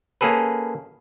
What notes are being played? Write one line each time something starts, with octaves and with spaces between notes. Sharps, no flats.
A#3 C#4 G#4 A4 B4